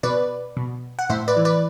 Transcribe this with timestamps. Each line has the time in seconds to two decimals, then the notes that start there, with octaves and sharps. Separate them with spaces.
0.03 B2 B4 D5
0.57 B2
0.99 F#5
1.10 A2 C5 E5
1.28 B4 D5
1.36 E3
1.45 B4 D5